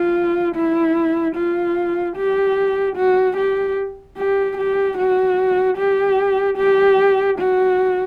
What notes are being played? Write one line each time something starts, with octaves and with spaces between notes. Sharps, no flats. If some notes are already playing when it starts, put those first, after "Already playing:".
Already playing: F4
E4
F4
G4
F#4
G4
G4
G4
F#4
G4
G4
F#4